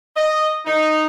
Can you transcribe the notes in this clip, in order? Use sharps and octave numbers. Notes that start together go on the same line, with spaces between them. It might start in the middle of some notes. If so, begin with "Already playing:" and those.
D#5
D#4